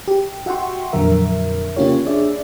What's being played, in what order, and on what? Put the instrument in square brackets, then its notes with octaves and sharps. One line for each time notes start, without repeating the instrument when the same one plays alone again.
[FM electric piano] G4
F#4 E5 F#5 G5 C6 C#6
F2 A#2 D3 F#3 A#4 E5
C#3 A#3 C#4 F4 G4 C#5
D4 G#4 D5 E5